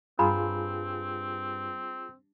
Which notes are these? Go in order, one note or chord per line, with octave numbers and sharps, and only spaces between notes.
G2 C4 F4 G#4 A#5 B5